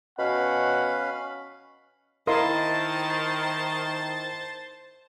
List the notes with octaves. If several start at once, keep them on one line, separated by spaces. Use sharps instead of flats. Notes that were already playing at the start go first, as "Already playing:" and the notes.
B2 C#4 F5 F#5 B5
D#3 E4 A#4 C5 D#5 F5 A5 C6